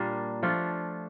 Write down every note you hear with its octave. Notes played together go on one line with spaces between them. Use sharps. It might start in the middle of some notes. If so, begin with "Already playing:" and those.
Already playing: A#2 G3 A#3 D4
F3 A3 D4 F4